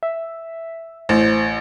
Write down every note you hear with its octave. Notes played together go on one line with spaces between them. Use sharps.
E5
A1 C5